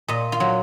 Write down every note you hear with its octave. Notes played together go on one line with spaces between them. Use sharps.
A#2 D#5
F4
F#3